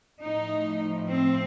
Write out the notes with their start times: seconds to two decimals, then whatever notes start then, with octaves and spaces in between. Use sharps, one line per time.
0.23 A2 F3 D#4
1.07 C4